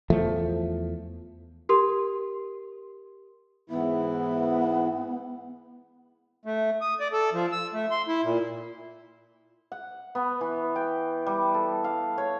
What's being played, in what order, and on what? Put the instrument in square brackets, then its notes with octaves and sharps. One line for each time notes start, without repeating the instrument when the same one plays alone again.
[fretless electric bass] E2 F3 A3
[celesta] G4 A#4 C6
[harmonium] G#2 E3 E4 [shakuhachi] B3
[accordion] A3
D#6
D5
A4
F3
E6
A3
C6
E4
A#2
[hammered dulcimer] F#5
B3
E3
G5
G3
A4
F5
C#5